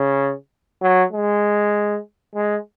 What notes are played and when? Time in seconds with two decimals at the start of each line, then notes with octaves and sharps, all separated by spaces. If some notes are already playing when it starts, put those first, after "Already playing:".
Already playing: C#3
0.82 F#3
1.12 G#3
2.35 G#3